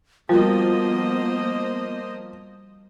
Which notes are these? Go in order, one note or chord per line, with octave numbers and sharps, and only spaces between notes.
F3 G3 A#3 B3 F#4 A#4 C5 D#5